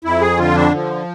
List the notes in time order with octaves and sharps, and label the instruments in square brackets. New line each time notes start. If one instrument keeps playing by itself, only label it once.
[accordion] F2 E4
G#4
D3 F4
D4
F3